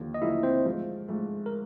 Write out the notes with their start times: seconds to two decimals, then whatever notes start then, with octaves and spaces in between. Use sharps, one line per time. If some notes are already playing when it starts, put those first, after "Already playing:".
Already playing: D#2 D3 F3 A#3
0.14 D#5
0.21 D#2 D3 F3 A#3 E4 E5
0.43 C4 C5
0.65 G#2 F3 A3
1.08 G#2 F3 A3
1.46 A#4